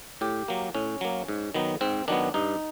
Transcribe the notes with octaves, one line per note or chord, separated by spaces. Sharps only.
A2 G4
F#3 A#3
A2 C#4
F#3 A#3
G#2
D#3 F#3 B3
G#2 C4
D#3 F#3 B3 D4
G2 D#4